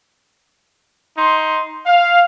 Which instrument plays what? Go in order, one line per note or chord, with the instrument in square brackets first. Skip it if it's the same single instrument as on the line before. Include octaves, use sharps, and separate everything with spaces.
[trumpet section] D#4 C6
F5